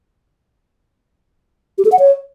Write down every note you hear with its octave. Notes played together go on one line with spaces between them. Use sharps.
G4
A4
F#5
C#5